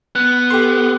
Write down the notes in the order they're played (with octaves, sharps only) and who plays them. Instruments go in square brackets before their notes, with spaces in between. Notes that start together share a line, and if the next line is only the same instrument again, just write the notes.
[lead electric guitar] B3 [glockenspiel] F#6
[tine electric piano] G4 C6 [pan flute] A4